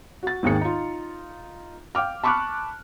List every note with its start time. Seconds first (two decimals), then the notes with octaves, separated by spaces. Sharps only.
0.23 F#4 A6
0.43 G#1 D#2 D#3 G#4 C#7
0.61 D#4 F4
1.95 F5 G5 D6 F6
2.24 A5 B5 C#6 D6 F6 F#6